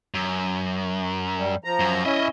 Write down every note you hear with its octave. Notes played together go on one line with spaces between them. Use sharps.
F#2
G3
F3 A#5
F#2
C#4 E4 D#5 E5